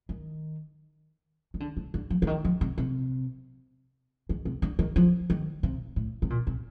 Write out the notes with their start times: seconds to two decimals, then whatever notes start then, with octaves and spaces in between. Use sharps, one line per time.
0.09 D#3
1.54 D#3
1.60 D3
1.77 C3
1.94 D3
2.10 F3
2.22 D3
2.27 D#3
2.45 F3
2.61 C3
2.78 C3
4.29 D#3
4.45 C3
4.62 D3
4.79 D#3
4.96 F3
5.30 D#3
5.63 C3
5.96 A2
6.22 C3
6.30 A#2
6.47 C3